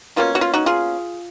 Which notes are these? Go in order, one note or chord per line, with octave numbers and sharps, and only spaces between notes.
B2 A#3 C#4 F4
F#4
F4
D#4 F#4
F4 G#4